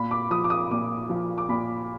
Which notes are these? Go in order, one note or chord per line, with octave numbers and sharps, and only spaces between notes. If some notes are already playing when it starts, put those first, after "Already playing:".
Already playing: A#2 B5
D6
F3 D#6
D6
D#6
A#2 D6
F3
D6
A#2 B5